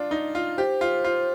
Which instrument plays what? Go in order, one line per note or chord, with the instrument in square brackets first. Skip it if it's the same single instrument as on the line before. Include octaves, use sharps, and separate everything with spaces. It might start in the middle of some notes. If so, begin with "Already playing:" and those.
Already playing: [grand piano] D4 F4
D#4
F4
[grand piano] G4 [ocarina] C5
[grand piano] F4
F4